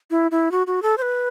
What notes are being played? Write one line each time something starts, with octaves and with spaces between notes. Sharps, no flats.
E4
E4
F#4
F#4
A4
C5
B4